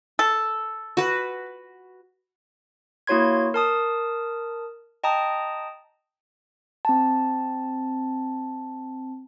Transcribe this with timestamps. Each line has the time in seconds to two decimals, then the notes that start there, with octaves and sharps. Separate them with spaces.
0.19 A4
0.97 F#4 B4
3.07 A#3 E4 F#4 C#5 C6 G#6
3.54 A#4 A5 D#6
5.04 D#5 G5 A5 A#5 D#6
6.85 C4 A5